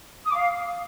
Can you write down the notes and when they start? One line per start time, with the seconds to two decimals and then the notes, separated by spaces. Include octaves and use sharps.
0.25 D#6
0.30 D6
0.35 F5